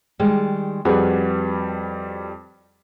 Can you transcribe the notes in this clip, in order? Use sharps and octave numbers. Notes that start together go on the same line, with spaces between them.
D#3 G3 G#3
F2 G3 F#4 G#4 B4